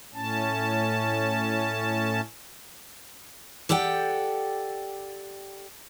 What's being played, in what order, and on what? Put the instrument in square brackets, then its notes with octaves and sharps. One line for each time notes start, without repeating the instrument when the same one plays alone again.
[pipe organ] A2 C#4 A5
[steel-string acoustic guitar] G4 A4 D5 F#5 G5